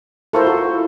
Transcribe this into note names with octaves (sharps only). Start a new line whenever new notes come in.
E4 F4 A4 A#4 C5 C#6
F#4